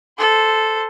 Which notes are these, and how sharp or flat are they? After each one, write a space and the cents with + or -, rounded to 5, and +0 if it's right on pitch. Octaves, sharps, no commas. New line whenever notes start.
A4 -5 C5 -10